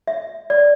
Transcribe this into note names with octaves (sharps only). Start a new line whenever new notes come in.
E5
D5